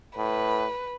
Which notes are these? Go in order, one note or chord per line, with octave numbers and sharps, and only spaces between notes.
A2 B4